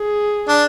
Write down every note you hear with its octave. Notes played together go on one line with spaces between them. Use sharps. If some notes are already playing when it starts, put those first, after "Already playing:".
Already playing: G#4
D4